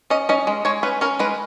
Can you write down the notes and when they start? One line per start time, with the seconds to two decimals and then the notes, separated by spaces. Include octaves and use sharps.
0.10 C#4 D#5
0.29 C#4 D#5
0.47 G#3
0.65 G#3 C#5
0.83 C#4 B4
1.01 C#4 A#4
1.19 G#3 B4